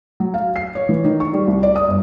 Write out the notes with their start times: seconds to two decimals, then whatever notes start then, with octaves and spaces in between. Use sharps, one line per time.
0.20 F#3
0.34 F5
0.56 C7
0.75 C#5
0.89 E3
1.05 D#3
1.20 C#6
1.33 G3
1.47 C2
1.63 D5
1.76 D#6
1.88 G1